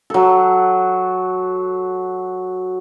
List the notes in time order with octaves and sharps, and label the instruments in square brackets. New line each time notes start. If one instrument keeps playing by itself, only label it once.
[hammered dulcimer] F#3 A4